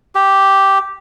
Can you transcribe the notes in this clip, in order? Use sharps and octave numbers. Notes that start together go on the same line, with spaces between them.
G4